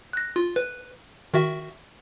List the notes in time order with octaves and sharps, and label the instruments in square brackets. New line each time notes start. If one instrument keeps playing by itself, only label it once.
[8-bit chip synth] F#6 A#6
F4
B4
D#3 F#4 E5